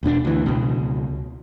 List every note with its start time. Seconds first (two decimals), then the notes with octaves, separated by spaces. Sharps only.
0.03 E1 B2 C#4 D4
0.25 D2 E3
0.46 C#2 B2